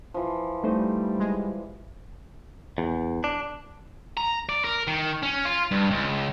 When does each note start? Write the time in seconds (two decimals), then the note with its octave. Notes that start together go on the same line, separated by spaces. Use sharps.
0.14 E3 F3
0.64 G3 A3 D#4 C5
1.20 G#3
2.78 E2
3.24 D4
4.17 A#5
4.49 D5
4.64 A#4
4.87 D#3
5.23 C#4
5.45 F4
5.71 G2
5.91 C#2